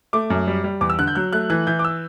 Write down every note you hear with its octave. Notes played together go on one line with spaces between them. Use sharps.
A3 D6
F#2
G3
G3
E2 D6
E6
D3 F#6
G6
F#3 F#6
A3 F#6
E3 F#6
E3 G6
D6
E6